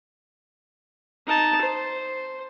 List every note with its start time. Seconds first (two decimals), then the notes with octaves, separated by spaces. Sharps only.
1.27 D#4 A5
1.61 C5